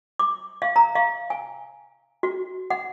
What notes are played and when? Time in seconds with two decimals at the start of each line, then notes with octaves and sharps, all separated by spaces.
0.19 D6
0.62 F5
0.76 A#5
0.95 F5
1.30 G#5
2.23 F#4
2.70 F#5